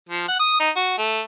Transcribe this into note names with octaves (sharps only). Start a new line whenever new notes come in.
F3
F#5
D#6
D#4
F#4
A3